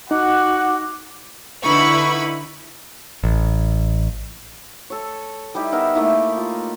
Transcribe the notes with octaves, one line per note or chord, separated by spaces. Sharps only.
D#4 F#4 F#5 D6
D3 D#4 E4 B4 B5 C#6
A1
A4 C#5
G3 D#4 E4 G4
B3 D#4 A#4 E5
A3 A#3 D#4 E4
F4